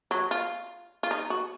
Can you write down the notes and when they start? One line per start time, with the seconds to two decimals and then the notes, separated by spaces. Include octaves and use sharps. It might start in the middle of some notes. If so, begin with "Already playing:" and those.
0.11 F#3
0.31 F4
1.03 F4
1.11 D#4
1.30 F#4